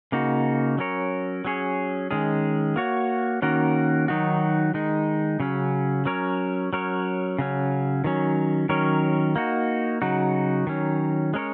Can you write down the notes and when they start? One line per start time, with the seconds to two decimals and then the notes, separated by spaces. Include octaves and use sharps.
0.12 C#3 A#3 D#4 F#4
0.78 F#3 C#4 A#4 C#5
1.45 F#3 C#4 G#4 C#5
2.11 D#3 G#3 C#4 G#4
2.76 A#3 F#4 C#5
3.42 D#3 A#3 C#4 F#4 A#4
4.08 D#3 F#3 D#4 F#4
4.74 D#3 G#3 D#4
5.40 C#3 F#3 C#4
6.06 F#3 C#4 A#4 C#5
6.73 F#3 C#4 A#4 C#5
7.38 C#3 F#3 C#4
8.04 D#3 F#3 C#4
8.69 D#3 F#3 C#4 A#4 C#5
9.36 A#3 D#4 F#4
10.02 C#3 F#3 D#4 F#4
10.67 D#3 F#3 C#4
11.34 G#3 C#4 A#4 C#5